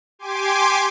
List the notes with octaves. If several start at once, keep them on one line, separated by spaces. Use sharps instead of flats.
G4 G#5 C6 D6